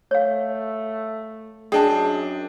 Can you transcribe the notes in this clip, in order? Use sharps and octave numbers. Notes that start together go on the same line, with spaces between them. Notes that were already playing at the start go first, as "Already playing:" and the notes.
A3 C#5 F5
F#2 D4 G#4 D#5 G5 A5